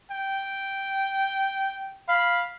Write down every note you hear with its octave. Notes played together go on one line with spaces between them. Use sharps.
G5
F5 B5